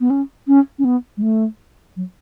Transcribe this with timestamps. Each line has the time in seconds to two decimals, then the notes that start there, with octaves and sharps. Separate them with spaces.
0.01 B3
0.10 C#4
0.48 C#4
0.79 C#4
0.85 B3
1.17 G#3
1.22 A3
1.96 F#3